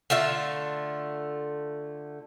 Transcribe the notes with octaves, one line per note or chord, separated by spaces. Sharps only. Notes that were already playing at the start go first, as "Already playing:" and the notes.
D3 A3 F4 E5